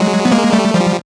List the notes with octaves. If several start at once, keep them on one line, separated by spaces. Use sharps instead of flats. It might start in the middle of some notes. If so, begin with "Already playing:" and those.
Already playing: F#3 G#3
B3
G#3 A#3
G3 A3
F3 G3